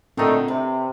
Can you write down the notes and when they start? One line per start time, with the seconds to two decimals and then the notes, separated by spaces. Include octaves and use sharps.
0.17 A#2 D3 D#3 A3 C4 D#4
0.48 C3 B4